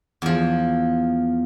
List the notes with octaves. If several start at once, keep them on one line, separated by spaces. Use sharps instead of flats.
E2 F3